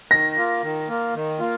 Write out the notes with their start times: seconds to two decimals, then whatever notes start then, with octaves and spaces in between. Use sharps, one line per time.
0.11 D#3 A#6
0.36 A#3 F4
0.63 D#3
0.88 A#3 F4
1.14 D#3
1.40 A#3 F4